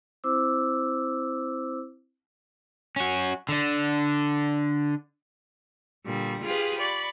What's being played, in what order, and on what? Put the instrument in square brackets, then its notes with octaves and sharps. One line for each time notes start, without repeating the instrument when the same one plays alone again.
[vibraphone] C4 E4 C5 D6 E6
[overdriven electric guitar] C#4 F#4
D3 D4
[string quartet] A#2 D3 G3
F4 G4 G#4 B4 F5
D5 B5 C#6